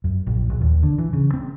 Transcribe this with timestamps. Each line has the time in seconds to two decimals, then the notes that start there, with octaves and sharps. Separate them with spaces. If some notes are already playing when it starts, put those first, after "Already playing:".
0.04 F#2
0.27 A#1
0.50 A#1
0.61 D#2
0.83 D3
0.98 E3
1.13 C#3
1.34 C4